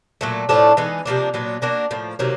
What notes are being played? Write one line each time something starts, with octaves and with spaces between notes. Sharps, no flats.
A#2 F#3 A3
A2 F3 A3 D4
E3 G#3 B3 D#4
C3 F3 A#3 D4
A#2 F#3 B3 D4
A#3 D4 F#4 A#4
A2 F3 A#3
C3 D#3 F#3 A#3